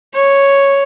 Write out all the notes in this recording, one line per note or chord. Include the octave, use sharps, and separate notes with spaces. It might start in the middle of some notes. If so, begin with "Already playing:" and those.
C#5